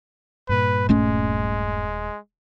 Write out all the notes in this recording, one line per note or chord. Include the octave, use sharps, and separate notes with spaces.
G2 A#2 B4
D#1 G#3 A3 C#4